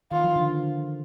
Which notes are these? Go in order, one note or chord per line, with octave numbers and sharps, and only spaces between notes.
D#3 F4
F3
D3